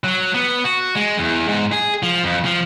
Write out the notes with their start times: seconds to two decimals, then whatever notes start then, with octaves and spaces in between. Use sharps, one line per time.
0.04 F#3
0.34 B3
0.64 F#4
0.95 G#3
1.18 E2
1.48 G#2
1.72 G#4
2.03 F3
2.24 F2
2.45 F3